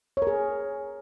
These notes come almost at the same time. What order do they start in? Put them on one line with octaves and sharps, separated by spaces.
C#5 A#4 G#4